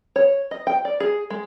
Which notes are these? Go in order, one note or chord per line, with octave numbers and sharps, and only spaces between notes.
C#5
D#5
G5
D5
G#4
G#3